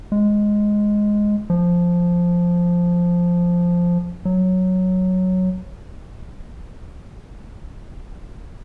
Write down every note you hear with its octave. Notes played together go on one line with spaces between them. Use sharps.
G#3
F3
F#3